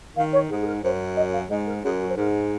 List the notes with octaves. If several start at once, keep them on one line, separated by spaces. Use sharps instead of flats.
D#3 F5
C#5
G#2 G#4
G#4
A#4
F#2 C5
D#5
F5
G#2 D#5
A#4
F#2 G#4
F#4
C5
G#2 A#4